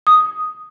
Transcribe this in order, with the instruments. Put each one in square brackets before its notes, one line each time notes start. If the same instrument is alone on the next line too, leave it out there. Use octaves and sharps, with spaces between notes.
[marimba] D#6